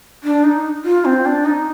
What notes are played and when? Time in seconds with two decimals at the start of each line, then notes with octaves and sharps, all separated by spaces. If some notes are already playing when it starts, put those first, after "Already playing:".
0.24 D4
0.44 D#4
0.85 F4
1.05 C4
1.26 D4
1.45 D#4